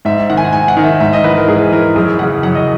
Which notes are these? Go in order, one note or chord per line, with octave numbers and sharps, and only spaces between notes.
G#2 E5
D#3 F#5
G#5
F#5
G#2 G#5
F#5
D#3
E5
G#2 E5
D#5
E3 B4
A#4
G#2 G#4
E3 A#4
F#2 G#4
C#3 E3 F#5
F#2 F#5
D#5